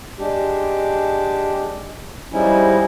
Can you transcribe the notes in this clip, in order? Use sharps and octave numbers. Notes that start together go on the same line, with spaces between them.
G#3 D4 G4
F3 G3 G#3 C#4 D#4 E4